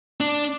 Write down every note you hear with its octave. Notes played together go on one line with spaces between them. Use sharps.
D4